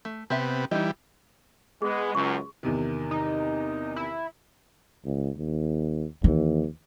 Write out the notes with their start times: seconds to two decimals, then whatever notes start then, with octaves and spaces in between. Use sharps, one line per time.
0.05 A3
0.30 C3 B3 C4 G4 E5
0.71 E3 G3 D#4 D#5
1.82 G#3 B3 G#4
2.15 C#2 F#2 C6 C#6
2.63 E2 C3 D#3
3.11 D#4
3.96 E4
5.05 C#2
5.37 D#2
6.24 D#2 E3